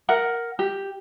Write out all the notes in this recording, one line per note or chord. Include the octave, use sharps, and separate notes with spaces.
A#4 F#5
G4